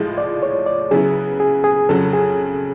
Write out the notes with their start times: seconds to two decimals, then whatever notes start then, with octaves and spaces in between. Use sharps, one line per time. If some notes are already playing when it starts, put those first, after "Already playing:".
Already playing: A2 F3 G#3
0.18 D5
0.43 C#5
0.66 D5
0.91 C#3 F#3 B3 E4 G#4
1.40 G#4
1.64 G#4
1.89 F2 C#3 F#3 A4
2.13 G#4